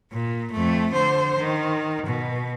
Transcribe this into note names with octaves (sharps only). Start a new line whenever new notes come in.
A#2
F2 A3
D3 C5
D#3
B2